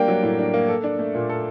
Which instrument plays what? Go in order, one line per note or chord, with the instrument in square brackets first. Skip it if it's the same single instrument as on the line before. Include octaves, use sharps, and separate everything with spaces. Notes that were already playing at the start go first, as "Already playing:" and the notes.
Already playing: [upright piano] G3 A#3 D4 [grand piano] G5
[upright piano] F#3
A2
D4
A#3
A4
D4
A3
A#2
A4